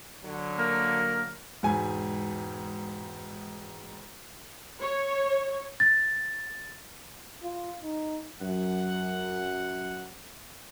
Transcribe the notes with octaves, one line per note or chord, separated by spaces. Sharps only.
D3 F#3
A#3 A#4
E1 G#2 G#5
C#5
A6
F4
D#4
F#2 F#5